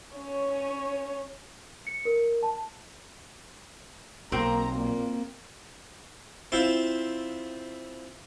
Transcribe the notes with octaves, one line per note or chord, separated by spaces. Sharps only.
C#4 C#5
C#7
A#4
A5
B1 A#3 C4 A#5
A#2 A#3
C4 E4 F4